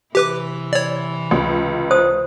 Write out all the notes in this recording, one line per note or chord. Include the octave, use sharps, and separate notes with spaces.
C3 E3 E4 G4 B4 D6
C#5 D5
C#2
C5 A5 D#6